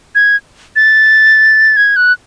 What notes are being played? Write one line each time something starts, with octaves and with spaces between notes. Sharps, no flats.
G#6
A6
G#6
F#6